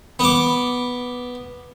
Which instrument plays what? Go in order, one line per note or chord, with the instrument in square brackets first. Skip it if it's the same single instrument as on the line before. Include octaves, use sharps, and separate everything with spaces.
[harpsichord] B3 D6